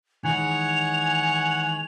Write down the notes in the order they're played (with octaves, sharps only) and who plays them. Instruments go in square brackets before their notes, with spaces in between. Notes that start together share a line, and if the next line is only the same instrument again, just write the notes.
[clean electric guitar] D#3 E3 G#3 [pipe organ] C#5 F#5 [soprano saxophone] G#5 [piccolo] F7